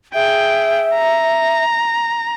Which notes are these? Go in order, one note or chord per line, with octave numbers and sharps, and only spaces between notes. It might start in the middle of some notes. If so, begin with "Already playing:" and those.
G#4 E5 G5
A#5